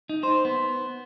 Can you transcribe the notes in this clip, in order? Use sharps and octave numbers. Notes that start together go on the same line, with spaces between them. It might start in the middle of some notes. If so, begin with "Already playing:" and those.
D#4
C5
B3